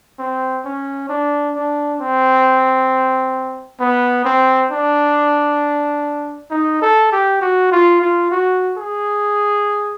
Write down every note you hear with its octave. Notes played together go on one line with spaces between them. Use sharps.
C4
C#4
D4
D4
C4
B3
C4
D4
D#4
A4
G4
F#4
F4
F4
F#4
G#4